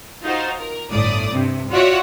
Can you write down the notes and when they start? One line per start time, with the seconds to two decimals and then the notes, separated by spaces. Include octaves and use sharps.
0.24 D#4 F4 F#4 C5
0.58 A#4
0.90 G1 A2 D5 D#6
1.30 G2 C3
1.70 F4 F#4 C#5 D5 E5 F#5